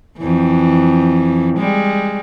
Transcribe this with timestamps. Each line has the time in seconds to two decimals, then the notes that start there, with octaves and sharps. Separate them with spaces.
0.18 F2 E3
1.58 G3 G#3